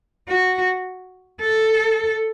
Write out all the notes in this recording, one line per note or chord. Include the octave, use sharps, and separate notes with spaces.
F#4
A4